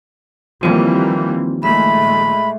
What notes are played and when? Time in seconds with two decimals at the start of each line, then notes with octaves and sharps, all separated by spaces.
0.63 D#2 E3 F3 G3 A#3 C4
1.63 A#2 G#3 A3 E5 B5